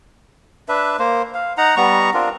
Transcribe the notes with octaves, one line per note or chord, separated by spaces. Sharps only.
D4 B4 E5
A#3 C5
F5
D#4 F#5 A#5
G3 B3 A#5 C#6
C4 D4 F4 A#4